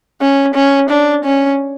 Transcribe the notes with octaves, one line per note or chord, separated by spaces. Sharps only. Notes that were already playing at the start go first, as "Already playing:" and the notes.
C#4
C#4
D4
C#4